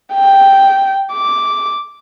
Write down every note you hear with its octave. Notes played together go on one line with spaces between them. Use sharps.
G5
D6